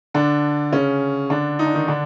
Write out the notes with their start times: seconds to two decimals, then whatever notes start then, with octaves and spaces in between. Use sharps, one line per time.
0.14 D3 D4
0.72 C#3 C#4
1.30 D3 D4
1.59 D#4
1.67 D4
1.75 D#3 D#4
1.88 D3 D4